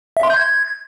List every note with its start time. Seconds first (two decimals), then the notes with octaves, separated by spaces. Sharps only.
0.17 E5
0.23 C6
0.30 G6
0.37 G#6